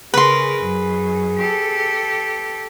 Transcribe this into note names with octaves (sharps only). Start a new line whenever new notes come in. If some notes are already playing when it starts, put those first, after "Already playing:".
C#3 G#4 A#4 B4 C6
F#2
G4 A4